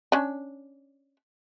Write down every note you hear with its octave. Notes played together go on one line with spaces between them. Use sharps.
C#4 D4